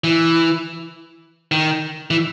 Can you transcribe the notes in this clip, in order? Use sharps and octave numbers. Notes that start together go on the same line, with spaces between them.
E3
D#3
E3